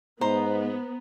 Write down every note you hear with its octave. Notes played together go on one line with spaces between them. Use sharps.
G#2 B3 C5 A#5